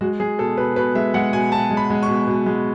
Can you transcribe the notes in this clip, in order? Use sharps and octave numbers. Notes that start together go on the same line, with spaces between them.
G#3 F#4
G#3 G#4
B2 A4
B2 B4
B2 B4
G#3 E5
G#3 F#5
B2 G#5
B2 A5
G#3
B5
G#3
C#6
B2
B2
G#3